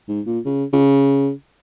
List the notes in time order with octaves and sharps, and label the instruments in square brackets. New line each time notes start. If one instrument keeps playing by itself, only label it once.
[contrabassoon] G#2
A#2
C#3
C#3